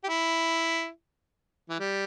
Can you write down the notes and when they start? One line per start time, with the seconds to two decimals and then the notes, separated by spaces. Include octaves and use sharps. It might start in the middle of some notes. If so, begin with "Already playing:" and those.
0.04 G4
0.09 E4
1.70 E3
1.80 G3